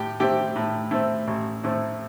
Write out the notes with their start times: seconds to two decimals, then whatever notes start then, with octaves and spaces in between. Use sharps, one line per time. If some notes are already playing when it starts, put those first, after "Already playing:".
Already playing: A2 G4
0.20 A3 C4 G4
0.56 A2
0.91 A3 C4
1.27 A1
1.64 A2 A3 C4